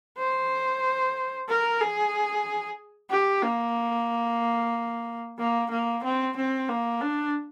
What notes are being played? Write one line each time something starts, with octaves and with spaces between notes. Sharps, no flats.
C5
A#4
G#4
G4
A#3
A#3
A#3
C4
C4
A#3
D4